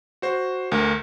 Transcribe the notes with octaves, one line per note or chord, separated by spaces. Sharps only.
F#4 C5
D2 A#4